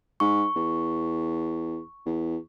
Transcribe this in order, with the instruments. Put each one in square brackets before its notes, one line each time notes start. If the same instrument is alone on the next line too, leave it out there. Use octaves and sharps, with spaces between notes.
[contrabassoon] G#2 [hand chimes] C#6
[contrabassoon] E2
E2